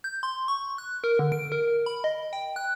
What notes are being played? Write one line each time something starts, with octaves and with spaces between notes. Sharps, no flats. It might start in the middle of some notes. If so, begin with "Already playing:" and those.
G6
C6
C#6
F#6
A#4
D3
D7
A#4
B5
D#5
G5
F#6